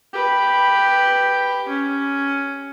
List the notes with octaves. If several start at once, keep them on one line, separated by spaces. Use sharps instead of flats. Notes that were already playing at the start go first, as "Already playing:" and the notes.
G4 B4
C#4